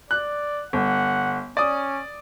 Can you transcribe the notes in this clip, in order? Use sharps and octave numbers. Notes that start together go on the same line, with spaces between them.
D5 F#6
G1 F#5
C#4 D5 D#6